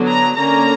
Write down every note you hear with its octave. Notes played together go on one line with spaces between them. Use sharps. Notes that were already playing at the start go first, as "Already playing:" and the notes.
Already playing: D3 F#3 B3
A#5
D3 A#3 C#4 A#5